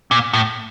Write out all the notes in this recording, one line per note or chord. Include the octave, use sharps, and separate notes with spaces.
A#2
A2